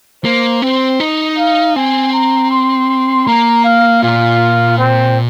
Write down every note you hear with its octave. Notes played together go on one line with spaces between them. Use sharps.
A#3 C5
C4 C5
D#4
F5
C4 G#5
A#5
C6
A#3 A#5
F5
A#2 F4
C4